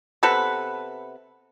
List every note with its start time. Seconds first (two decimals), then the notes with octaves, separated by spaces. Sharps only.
0.23 C3 B3 A4 B4